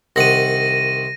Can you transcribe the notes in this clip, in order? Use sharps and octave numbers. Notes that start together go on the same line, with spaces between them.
C2 D#3 F#5 A#6 D#7